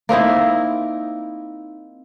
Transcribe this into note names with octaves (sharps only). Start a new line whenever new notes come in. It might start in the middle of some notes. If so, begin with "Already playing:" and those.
A#3 C4 D#4 E4